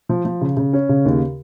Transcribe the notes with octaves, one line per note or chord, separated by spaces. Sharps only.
F3
F3
C#3
C#3
C#4
C#3
D#2